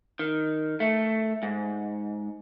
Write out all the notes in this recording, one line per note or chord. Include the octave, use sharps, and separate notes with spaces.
D#3
A3
G#2